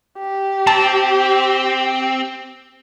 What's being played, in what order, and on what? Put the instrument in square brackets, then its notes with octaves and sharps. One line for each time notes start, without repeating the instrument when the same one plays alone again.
[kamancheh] G4
[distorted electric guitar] C4 [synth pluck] A5